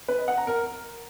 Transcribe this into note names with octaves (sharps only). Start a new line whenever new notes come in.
B4
D#5
F#5
A#5
A#4